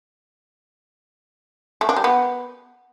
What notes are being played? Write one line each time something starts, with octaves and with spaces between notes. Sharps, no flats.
A3
D4
G3
B3